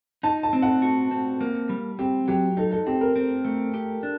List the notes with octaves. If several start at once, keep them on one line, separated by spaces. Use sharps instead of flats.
D#4 A5
A5
C4
F#5
F#4
C4
A#3
G3
C4 G4
F#3 G4
D#4 A4
A4
C4 G4
A#4
C4
A3
G4
D4